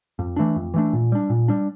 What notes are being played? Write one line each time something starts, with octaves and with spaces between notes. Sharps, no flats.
F2
E3 A3 D4
F2
E3 A3 D4
A#2
G3 D4
A#2
G3 D4